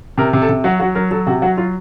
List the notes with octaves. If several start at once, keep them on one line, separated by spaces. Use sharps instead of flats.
C3 A#4
C3
A4
C3
F#3 F#4
F#3 F#4
F#3 A#4
F#3 A4
C3 F#4
F#3 F#4
F#3 F4